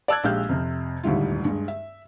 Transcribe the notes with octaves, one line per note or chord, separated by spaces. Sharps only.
D5 A5 E6 F#6 G#6
A#1 G#3 G4 F5 F6 G6
F2 C3
D#1 D2 G#2 G3 E4 F4
G2 G#3
E5